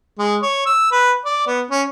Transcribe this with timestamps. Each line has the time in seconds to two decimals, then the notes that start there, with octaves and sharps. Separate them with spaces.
0.19 G#3
0.43 C#5
0.66 E6
0.92 B4
1.25 D5
1.47 B3
1.71 C#4